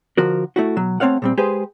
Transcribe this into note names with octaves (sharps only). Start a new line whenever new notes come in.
D3 F3 F#4 A#4
A3 E4 F#4
B2 F#3
A3 C4 C#5 F5 F#5
A#2 G3 C4
G#3 G4 G#4 B4 C5